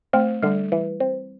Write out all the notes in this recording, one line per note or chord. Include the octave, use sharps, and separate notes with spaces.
A3 C4
D3 G3
E3
C4